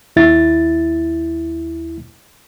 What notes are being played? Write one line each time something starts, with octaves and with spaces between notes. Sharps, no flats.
D#2 E4 A6